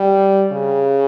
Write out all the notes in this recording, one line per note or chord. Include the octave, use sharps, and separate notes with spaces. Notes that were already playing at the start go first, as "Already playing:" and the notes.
Already playing: G3
C#3